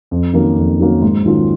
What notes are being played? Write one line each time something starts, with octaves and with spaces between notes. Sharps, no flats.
F2
D#3 F#3 A#3 C#4
F2
D#3 F#3 A#3 C#4
G#2
D#3 F#3 C#4 F4